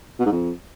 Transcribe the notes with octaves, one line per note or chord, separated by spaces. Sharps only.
B2
G#2
F2